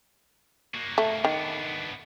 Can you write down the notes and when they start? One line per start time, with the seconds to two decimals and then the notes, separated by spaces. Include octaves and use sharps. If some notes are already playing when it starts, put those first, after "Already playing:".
0.75 A#3 F#4
0.98 A3
1.25 D#3 B3 D4